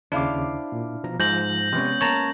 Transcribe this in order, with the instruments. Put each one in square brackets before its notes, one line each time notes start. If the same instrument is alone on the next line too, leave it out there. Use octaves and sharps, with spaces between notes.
[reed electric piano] D#2 C#3 [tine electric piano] D4 E4 [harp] C5 F5 D6
[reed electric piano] A#2
B2 F3 A#5
[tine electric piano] G#2 [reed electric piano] F3 [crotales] G6 A#6 F#7
[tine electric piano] C3 [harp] G#3 B3 C#4
[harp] A#3 [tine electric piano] C#5 A5 A#5